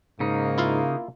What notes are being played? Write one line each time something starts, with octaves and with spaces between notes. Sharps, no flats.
G#2 C#3 A#3 D#4
E4 F4 F5